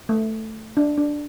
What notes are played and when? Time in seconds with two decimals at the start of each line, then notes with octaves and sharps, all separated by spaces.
0.09 A3
0.77 D4
0.98 D4